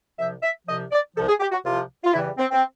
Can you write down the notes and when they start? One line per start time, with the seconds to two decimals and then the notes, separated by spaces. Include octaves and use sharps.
0.18 C2 C3 F3 E5
0.43 E5
0.67 C2 C3 F3 D#5
0.91 D5
1.15 C2 C3 F3 A4
1.28 G#4
1.40 G4
1.51 F#4
1.64 C2 C3 F3 F4
2.04 F4
2.12 E2 C#3 E3 G3 E4
2.38 C4
2.51 C4